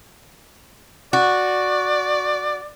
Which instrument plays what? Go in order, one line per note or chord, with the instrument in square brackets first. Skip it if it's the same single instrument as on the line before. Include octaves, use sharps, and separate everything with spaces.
[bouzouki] F#4 [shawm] D5